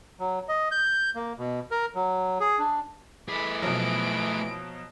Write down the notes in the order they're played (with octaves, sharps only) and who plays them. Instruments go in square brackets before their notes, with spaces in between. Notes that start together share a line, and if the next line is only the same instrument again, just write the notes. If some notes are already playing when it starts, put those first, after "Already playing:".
[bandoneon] F#3
D#5
G6
A#3
B2
A#4
F#3
G#4
D4
[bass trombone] E3 [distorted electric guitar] A3 G#4 [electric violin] D5 B5
[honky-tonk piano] B2 F3 F#3 [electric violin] D7